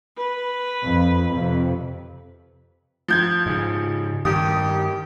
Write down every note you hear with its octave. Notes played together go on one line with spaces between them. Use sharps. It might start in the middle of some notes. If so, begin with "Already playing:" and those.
B4
F2
F2 C3
F3 G6 G#6
G#2 C#3
G2 D#3 G4 D#6